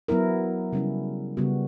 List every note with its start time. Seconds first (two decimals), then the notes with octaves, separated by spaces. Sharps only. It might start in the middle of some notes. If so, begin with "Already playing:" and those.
0.08 F#3 B3 E4 A#4
0.73 C#3 G3 C#4 E4
1.37 C#3 G3 B3 F#4